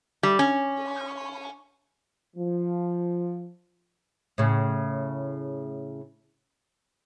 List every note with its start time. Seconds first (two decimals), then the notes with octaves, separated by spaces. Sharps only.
0.23 G3
0.39 C#4
2.37 F3
4.38 A2 C#3